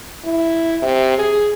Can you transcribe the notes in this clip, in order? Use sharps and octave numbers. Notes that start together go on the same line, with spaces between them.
E4
C3
G#4